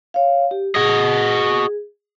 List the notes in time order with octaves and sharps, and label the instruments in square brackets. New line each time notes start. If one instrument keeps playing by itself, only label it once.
[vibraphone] C#5 F5
G4
[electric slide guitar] F#4 D#5 [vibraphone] G#4